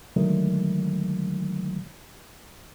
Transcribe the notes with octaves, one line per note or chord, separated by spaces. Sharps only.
D3 D#3 F#3 G#3 A3